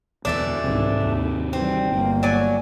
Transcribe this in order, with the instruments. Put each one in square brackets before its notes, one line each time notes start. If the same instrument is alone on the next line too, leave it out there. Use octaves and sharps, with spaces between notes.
[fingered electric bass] D1 E2 B2 [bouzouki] E3 A3 D4
[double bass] C2 G#2 [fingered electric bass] C3 D#3
[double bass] D#2
[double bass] E3 G3 [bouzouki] C4
[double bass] G1 A#3
[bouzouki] F#3 D5 G#5